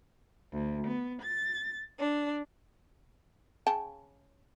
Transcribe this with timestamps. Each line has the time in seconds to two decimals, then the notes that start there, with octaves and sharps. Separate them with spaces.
0.51 D2
0.87 B3
1.22 A6
1.98 D4
3.67 C#3 G5 A5